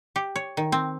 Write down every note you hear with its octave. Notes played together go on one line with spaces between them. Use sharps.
G4
C#5
D#3
C4